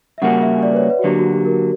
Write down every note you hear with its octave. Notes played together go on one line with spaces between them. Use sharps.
E5
C#3 G3 A#3 C#4 F#4 F#5
E5
D5
B4
C#5
B4
F#4
D3 F#3 A#3 G4
F#4
G4
A#4